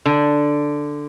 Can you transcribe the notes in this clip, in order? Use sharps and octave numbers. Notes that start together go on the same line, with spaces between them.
D3